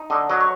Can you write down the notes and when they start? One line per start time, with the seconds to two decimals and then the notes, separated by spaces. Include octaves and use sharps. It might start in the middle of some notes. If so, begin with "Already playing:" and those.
Already playing: D#4
0.10 D3 D#5
0.30 F#3 D#5
0.41 C#5